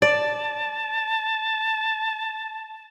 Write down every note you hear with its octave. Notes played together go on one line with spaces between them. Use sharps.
D5 A5